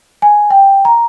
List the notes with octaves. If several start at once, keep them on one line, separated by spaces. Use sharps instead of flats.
G#5
G5
A#5